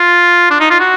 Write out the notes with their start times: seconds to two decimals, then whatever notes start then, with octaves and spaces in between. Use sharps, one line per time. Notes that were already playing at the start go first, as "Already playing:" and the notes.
Already playing: F4
0.51 D4
0.60 D#4
0.70 F4
0.80 F#4